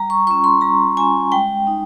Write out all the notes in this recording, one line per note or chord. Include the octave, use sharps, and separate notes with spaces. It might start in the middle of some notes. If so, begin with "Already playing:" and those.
Already playing: G3 A#5
C#6
C#4 F4 C#6
C6
G3 A#5
C#4 F4 G#5
G#3 G5
D#4